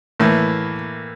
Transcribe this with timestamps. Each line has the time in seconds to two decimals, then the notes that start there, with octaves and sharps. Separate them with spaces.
0.20 A2 E3 A#3